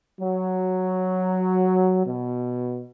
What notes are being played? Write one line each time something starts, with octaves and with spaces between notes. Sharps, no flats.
F#3
B2